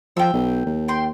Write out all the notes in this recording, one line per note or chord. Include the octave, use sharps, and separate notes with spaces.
F3 G5 E6
B1
D#2
G5 C6